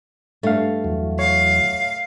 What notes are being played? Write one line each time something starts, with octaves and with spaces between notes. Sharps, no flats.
G2 A3 F5
E2 F#3
C#5 F5